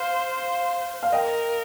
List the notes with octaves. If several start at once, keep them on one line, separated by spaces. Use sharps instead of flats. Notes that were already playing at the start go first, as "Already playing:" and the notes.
Already playing: C5 F5
F5
A#4 D#5 G5